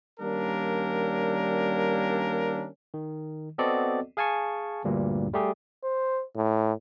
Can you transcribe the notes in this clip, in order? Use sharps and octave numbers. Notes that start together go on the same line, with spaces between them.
D#3 G3 A#3 C#4 D4 A#4
D#3
B3 C4 F#4 A4 D5 D#5
G#4 F5 G#5 A5 C#6
D2 G2 A#2
G3 A3 G4 G#4
C5
A2